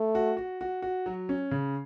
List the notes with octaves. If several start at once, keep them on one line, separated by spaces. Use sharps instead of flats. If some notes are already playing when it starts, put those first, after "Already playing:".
Already playing: A3
F#4
F#4
F#4
F#4
F#3
C#4
C#3